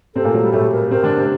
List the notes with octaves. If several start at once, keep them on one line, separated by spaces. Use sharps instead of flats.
C3 C4 A4
A#2 A#3
F#3
G3
A2 A3 A4
A#4
C3 C4 A#4
D3 D4
C3 C4